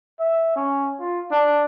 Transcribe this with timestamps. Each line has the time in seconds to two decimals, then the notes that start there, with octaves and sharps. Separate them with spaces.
0.20 E5
0.56 C#4
1.00 F4
1.31 D4